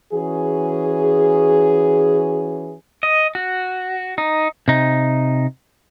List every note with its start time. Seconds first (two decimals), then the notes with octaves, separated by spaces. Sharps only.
0.13 E3 C#4 F#4 G#4
3.03 D#5
3.35 F#4
4.18 D#4
4.68 C3 D#4